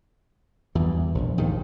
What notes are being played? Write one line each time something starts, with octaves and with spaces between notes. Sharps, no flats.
E2 G2 E3
A#1
D#2 G#2 D#3